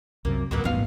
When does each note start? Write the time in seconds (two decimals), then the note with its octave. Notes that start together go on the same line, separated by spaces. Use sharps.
0.25 C2 F#2 C3 A#3
0.51 C#2 F#2 F#3 A#3 B3
0.64 D#1 A1 G#2 B3 F5